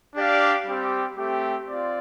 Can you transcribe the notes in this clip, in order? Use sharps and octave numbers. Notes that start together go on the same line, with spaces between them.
D4 G4 D5 F5
G3 C4 G4
A3 C4 G4
C4 F4 D5